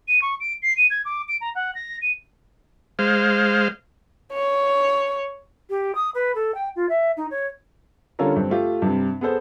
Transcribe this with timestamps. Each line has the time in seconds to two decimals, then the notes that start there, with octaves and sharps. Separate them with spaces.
0.08 D#7
0.22 C#6
0.40 D7
0.62 C7
0.77 D#7
0.90 G#6
1.05 D6
1.28 D7
1.41 A#5
1.55 F#5
1.75 A#6
2.02 D#7
2.99 G#3 C5 F5
4.33 C#5
5.70 G4
5.95 D#6
6.14 B4
6.35 A4
6.54 G5
6.76 F4
6.89 E5
7.17 D#4
7.30 C#5
8.19 D3 G3 C#4 F4 A4 A#4
8.36 G2 C4
8.50 A3 F4 G4
8.82 G2 C3
9.21 B3 G#4 A4 C5